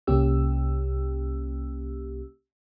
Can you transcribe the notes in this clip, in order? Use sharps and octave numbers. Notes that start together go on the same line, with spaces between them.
C2 A#3 C#4 G4 E6